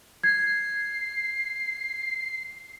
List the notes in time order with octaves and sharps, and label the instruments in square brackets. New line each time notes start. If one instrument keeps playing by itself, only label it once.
[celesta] G#6 [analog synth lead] C7